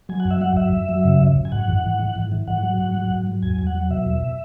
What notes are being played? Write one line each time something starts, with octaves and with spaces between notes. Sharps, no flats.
F#3 G#5
F#5
F#2
E5
F#3 F#5
F#2 E5
F#2
F#3
C#3
F#2
F#2
G#5
G#2 F#5
E3
G#2
E3
G#2
E3
G#2 F#5
F#3
G#2
F#3
G#2
F#3
E2 G#5
E2
F#5
F#3
B2 E5
E2